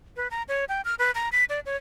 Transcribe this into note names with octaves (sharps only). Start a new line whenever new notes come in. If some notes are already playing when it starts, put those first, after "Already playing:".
B4
A#5
C#5
G5
F6
B4
A#5
B6
D5
C#5